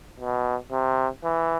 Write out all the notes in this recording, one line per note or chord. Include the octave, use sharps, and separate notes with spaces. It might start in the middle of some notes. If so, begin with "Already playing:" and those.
B2
C3
E3